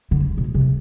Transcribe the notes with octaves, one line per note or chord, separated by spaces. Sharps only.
D3
B2
C3